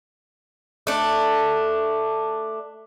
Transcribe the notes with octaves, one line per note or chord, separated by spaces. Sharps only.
A3 D4